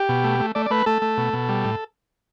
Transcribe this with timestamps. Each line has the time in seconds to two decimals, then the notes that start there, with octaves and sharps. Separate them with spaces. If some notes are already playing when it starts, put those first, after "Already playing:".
Already playing: G4
0.09 B2
0.24 A3
0.40 A3
0.55 A3 D5
0.66 D5
0.71 A3 B4
0.86 A3 A4
1.02 A3
1.17 B2
1.33 B2
1.49 G3
1.64 A2